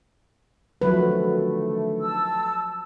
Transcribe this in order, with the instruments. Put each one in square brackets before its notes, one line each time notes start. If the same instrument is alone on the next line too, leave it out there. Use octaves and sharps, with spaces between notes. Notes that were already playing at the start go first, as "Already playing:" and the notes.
[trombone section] D3 D#3 A3 [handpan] F3 F#3 B4
[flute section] A5 E6